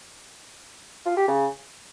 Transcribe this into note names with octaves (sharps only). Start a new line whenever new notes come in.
F4
G4
C#3